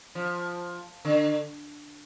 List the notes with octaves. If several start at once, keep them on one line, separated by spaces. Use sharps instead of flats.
F3
D3